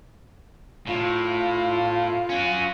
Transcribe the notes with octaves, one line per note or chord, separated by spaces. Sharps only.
A2 F4
C#4 F#4